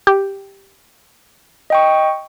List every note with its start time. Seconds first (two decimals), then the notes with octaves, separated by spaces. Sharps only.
0.07 G4
1.70 D#5 G5 C#6